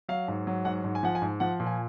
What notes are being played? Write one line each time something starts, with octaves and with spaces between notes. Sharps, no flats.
F#3 F5
G#2
F#3
G#2 F#5
G#2
G#5
F3 F#5
G#5
G#2
F3 F#5
A#2
G#5